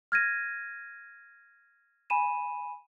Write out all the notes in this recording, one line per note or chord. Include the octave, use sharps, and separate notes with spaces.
F6 G#6 A#6 D#7
G#5 B5 D#7 E7